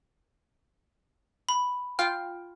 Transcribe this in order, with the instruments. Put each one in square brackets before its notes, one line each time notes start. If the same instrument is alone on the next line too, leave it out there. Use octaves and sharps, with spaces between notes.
[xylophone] B5
[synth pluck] F4 F5 G5 [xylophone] F6